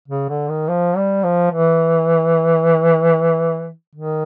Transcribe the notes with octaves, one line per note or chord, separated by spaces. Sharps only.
C#3
D3
D#3
F3
G3
F3
E3
D#3